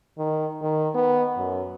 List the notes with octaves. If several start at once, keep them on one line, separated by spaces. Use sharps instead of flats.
D#3
D#3
B3
F#2